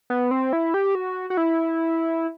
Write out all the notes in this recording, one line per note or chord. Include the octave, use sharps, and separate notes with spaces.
B3
C4
E4
G4
F#4
F#4
E4